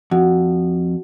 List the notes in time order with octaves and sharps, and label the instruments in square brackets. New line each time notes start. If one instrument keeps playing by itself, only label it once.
[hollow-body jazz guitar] F2 [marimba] F#4 F#5